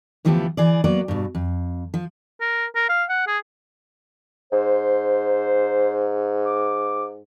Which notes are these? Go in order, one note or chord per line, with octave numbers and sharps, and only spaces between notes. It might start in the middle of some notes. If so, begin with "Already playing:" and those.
D2 E3 F3 A3 B3 G4
E3 G#4 D5
F#3 A#3 B3 D5
G2 B2
F2
F3
A#4
A#4
F5
F#5
G#4
G#2 C5
D6